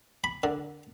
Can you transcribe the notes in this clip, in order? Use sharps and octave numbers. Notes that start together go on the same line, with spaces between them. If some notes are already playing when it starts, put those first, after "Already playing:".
B5
D3